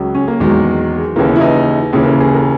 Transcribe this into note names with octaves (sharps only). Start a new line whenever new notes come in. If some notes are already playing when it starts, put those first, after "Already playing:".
Already playing: C#2 F#3
C#4
A#3
E2 D#3 F#3 G#3
D#2 C#3 E3 A#3
B3
E4
D#4
D#2 C#3 E3
A#4
G#4
A#4